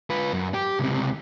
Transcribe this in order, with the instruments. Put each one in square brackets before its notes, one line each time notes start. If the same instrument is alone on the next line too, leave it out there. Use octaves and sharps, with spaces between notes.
[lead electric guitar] F4 B4
F#2
G4
C#2 C3